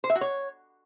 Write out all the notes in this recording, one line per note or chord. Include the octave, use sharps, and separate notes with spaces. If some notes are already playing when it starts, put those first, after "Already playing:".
C5
E5
F#4
C#5